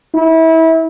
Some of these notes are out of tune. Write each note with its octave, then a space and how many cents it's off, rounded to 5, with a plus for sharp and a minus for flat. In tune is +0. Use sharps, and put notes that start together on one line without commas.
E4 -25